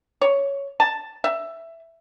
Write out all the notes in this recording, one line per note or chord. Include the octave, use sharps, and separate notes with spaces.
C#5
A5
E5